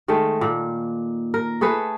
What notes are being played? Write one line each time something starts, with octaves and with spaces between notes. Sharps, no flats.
D#3 G#3 A3
A#2
A#4
A3 G#4 A4 B4